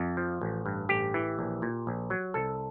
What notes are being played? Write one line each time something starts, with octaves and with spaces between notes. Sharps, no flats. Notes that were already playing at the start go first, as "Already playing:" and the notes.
Already playing: F2
F3
A1
G2
A1 G4
E3
A#1
A#2
A#1
F#3
C2 A4